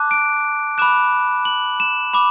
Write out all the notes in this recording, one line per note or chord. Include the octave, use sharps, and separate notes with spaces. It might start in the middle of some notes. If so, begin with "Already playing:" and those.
Already playing: A5 D6 F#6
D7
B5 D6 F#6 E7
F#7
E7
B5 D6